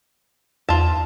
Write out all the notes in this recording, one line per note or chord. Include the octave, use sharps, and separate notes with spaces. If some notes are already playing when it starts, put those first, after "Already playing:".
E2 F4 A5